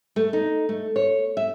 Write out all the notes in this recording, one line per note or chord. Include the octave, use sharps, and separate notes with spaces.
A3
D#4
A3
C#5
E5